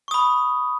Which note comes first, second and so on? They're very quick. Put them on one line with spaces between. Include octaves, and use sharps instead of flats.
C#6 D#6 B5